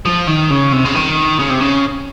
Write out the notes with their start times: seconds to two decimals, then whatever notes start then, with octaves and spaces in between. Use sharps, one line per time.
0.06 F3
0.28 D#3
0.50 C#3
0.72 C3
0.85 C#3
0.94 D#3
1.39 C#3
1.49 C3
1.60 C#3